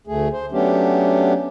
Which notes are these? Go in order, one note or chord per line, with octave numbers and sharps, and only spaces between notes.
D2 A3 G#4
C5
F#3 A3 B3 C#4 D4 G4